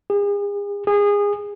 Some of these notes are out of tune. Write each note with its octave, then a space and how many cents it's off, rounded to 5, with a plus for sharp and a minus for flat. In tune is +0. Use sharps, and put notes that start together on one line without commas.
G#4 -40
G#4 -25